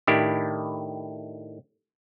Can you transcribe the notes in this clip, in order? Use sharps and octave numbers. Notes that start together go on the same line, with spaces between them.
A2 D#3 D4 E4 G4